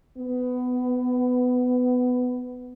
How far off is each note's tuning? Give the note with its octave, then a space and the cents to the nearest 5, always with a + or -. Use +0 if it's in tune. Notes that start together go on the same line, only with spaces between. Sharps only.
B3 +15